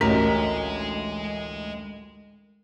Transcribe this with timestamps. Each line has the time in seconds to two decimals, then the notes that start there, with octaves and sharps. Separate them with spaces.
0.01 A1 D2 G#3 A#4 D#5 B6